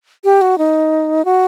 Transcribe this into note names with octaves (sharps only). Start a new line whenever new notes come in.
G4
F#4
D#4
F#4